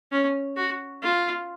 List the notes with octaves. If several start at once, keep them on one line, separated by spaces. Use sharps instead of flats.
C#4
F#4
F4